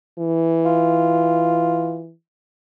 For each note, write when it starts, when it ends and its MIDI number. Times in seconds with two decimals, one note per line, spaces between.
0.18 2.13 52
0.66 2.01 65